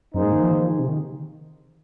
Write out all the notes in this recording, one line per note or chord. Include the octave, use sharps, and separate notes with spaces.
F#2 A#3 D#4 G#4 C5
G#2
D#3
F3
D#3
F3
D#3
C3
D#3